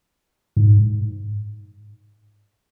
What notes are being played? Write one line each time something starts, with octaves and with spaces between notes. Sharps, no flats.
G#2